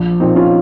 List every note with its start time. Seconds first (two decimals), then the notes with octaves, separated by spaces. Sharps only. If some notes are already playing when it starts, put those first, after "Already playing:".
Already playing: A#1
0.20 A#2 C4 D#4
0.36 C#4 F4